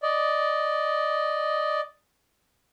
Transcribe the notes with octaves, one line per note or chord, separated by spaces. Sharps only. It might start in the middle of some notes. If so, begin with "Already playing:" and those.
D5 D#5